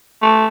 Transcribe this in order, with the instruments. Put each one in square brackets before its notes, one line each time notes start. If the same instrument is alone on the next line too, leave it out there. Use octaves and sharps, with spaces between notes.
[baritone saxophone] A3